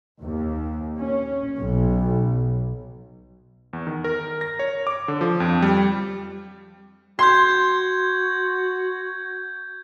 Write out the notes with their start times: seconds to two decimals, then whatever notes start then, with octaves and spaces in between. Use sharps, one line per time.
0.22 D#2
0.99 C#4
1.60 B1
3.73 E2
3.87 D#3
4.04 A#4
4.41 A#6
4.59 C#5
4.87 D6
5.08 D3
5.21 F3
5.40 F2
5.62 G3
7.19 F#4 C6 G6 G#6